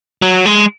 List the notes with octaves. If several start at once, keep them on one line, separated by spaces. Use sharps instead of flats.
F#3
G#3